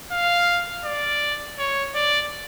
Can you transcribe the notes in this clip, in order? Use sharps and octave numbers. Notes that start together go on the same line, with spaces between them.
F5
D5
C#5
D5